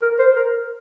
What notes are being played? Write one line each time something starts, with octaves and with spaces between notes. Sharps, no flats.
A#4
C5
A#4